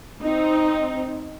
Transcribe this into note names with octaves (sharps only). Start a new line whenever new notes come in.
C4 D#4